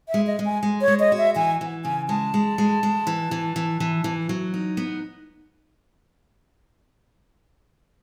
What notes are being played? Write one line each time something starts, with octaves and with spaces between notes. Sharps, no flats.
E5
G#3
D#5
G#3
G#5
G#3
C#5
G#3
D#5
F#4
E5
E3 G#5
E3
C#3 G#5
G#3 A5
G#3
G#3
G#3
E3
E3
E3
E3
E3
F#3
D#4
B3